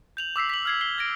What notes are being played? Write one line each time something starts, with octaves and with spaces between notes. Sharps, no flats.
G6 F7 F#7
D6 E6 B6 C7
B6 F#7
F6 G#6 C7
C7 G7
G#6 A#6 D7